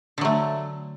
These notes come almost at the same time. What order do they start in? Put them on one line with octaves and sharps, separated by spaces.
D3 F#3 A3